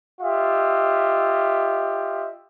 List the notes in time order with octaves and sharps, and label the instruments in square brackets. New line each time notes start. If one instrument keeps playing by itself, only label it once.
[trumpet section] F4 G4 D#5 E5